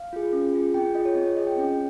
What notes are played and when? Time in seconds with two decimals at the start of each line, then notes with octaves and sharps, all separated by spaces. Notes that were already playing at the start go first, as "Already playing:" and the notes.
Already playing: F5
0.13 F4 G#4
0.33 C#4
0.53 F4 G#4
0.74 C4 G5
0.95 F4 D#5
0.98 G#4
1.05 C#5
1.16 C4 D#5
1.26 C#5
1.36 F4 G#4 D#5
1.47 G5
1.58 C#4 G5